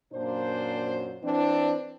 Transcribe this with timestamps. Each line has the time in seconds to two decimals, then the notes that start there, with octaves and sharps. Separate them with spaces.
0.13 F#2 A#2 D4 C5
1.23 E3 C4 D4